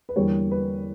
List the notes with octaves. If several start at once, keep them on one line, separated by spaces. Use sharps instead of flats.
B4
E2 D3 G3 A#3 C#5
B4